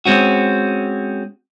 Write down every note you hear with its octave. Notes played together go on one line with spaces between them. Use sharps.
G#3 C4 C#4 F#4